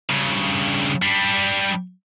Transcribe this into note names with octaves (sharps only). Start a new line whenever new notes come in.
G2 C#3
G3 D4